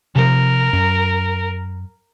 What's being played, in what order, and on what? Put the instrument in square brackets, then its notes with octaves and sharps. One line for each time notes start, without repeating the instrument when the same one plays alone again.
[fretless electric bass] C3 F3 [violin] A#4
[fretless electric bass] F#2